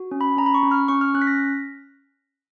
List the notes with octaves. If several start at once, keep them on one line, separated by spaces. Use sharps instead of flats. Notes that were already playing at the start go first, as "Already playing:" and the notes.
Already playing: F#4
C#4
B5
C#4 A#5
B5
C#6
C#4
F6
C#4 C#6
F6
C#4 F#6
B6
A#6